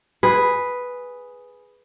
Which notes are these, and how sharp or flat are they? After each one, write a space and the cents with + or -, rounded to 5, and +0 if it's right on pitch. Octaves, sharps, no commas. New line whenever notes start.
G#4 +0 B4 +0